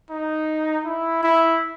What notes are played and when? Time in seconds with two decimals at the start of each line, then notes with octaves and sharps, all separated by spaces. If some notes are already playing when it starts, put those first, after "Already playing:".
0.10 D#4
0.85 E4
1.23 E4